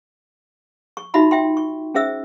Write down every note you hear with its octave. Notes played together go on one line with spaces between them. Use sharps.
C#6
D#4 F4 F#4 E5 B5 C6
E5 G5 C6
C#6
C#4 G#4 C5 E5 E6